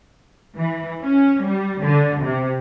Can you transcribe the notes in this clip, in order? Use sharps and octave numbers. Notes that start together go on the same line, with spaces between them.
E3
C#4
G3
D3
C3